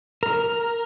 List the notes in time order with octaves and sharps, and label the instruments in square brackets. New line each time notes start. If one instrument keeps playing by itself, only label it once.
[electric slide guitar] A#4